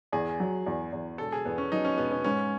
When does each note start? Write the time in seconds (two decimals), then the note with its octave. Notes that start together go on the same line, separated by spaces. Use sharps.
0.13 E2 G#4
0.40 F#3
0.66 E2
0.93 E2
1.18 E1 A4
1.32 G#4
1.45 E2 B3
1.58 C#4
1.72 F#3 D#4
1.85 C#4
1.98 E1 B3
2.11 C#4
2.24 G#2 C#4